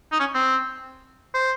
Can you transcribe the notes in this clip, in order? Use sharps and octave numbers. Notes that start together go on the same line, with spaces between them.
D#4
C#4
C4
C5